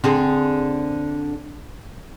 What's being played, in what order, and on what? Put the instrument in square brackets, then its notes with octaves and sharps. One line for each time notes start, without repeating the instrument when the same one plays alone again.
[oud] D3 C4 G#4